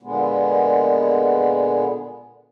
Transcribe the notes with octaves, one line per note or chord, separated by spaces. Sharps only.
A#2 D3 G#3 B3